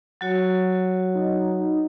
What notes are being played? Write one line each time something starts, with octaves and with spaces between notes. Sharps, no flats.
F#3 F#4 C#5
D#4